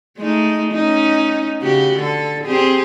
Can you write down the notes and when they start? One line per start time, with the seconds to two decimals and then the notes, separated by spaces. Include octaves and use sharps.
0.18 G#3 A3 D#4
0.73 C#4 D#4
1.60 C#3 F#4 G4
1.97 D3 A4
2.44 C4 G4 G#4